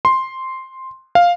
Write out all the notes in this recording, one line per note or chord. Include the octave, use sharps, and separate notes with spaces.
C6
F5